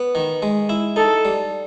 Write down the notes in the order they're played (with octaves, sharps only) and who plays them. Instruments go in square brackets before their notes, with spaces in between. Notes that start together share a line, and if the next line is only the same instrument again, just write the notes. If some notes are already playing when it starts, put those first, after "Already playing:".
Already playing: [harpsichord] B3
D#3
G#3
E4
[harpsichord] D#4 [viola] A4
[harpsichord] G3